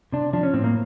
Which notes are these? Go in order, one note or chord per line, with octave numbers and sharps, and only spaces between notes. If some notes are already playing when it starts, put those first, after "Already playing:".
C3 D4
F3 D4
C#4
A2 C4
A#3